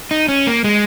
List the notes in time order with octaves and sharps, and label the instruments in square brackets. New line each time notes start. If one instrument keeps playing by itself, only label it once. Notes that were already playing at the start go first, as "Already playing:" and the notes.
[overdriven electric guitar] D#4
C#4
A#3
G#3